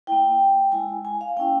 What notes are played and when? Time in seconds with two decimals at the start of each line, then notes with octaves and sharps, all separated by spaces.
0.07 A#3 E4 G5
0.72 G#3 E4 G#5
1.05 G#5
1.21 F5
1.37 A#3 C#4 E4 G5